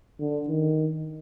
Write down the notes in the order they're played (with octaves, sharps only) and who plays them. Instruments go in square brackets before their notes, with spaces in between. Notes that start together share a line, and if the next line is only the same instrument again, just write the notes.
[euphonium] D3
D#3